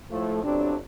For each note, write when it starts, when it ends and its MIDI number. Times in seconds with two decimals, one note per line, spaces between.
0.12 0.42 45
0.12 0.42 53
0.12 0.42 57
0.44 0.76 31
0.44 0.76 54
0.44 0.76 55
0.44 0.76 60
0.44 0.76 62